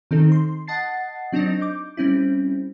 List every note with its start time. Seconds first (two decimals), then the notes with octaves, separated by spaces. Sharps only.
0.11 D#3 C4 D#4 A4
0.32 C6
0.67 D#5 F#5 A5 A6 C7
1.32 F#3 C4 D4 D#4 D#5
1.61 D6 G6
1.97 G3 C4 C#4 E4